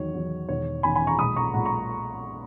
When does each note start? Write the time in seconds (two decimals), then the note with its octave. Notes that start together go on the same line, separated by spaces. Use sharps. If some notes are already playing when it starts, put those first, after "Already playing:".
Already playing: E2 D#3 F#3 C#5
0.14 E2 D#3 F#3
0.48 E1 E2 D#3 C#5
0.83 E1 E2 D#3 G#5 B5
0.96 G#5 B5
1.07 A#5 C#6
1.18 B1 A#2 G#3 B5 D#6
1.36 A#5 C#6
1.54 B1 A#2 G#3 F#5 A#5
1.65 A#5 C#6